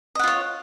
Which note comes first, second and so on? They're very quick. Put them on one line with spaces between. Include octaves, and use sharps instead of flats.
D#5 F#5 F4 C#5